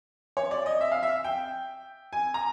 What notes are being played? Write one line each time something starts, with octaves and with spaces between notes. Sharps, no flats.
C#5
D5
D#5
E5
F5
E5
G5
G#5
A#5